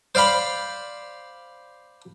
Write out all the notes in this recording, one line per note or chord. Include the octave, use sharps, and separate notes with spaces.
C5 D5 F5 B5 C6